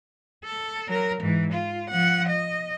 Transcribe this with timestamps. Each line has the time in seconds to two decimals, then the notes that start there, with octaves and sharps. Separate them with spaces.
0.44 A4
0.88 F#3 A#4
1.21 G#2 E3
1.53 F4
1.90 F3 F#5
2.29 D#5